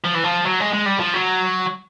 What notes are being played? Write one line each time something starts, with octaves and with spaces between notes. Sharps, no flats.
F3
E3
F3
F#3
G#3
G#3
G3
F3
F#3